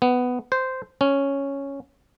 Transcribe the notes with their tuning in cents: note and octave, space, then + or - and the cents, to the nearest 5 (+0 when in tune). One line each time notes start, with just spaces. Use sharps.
B3 +10
C5 -10
C#4 +0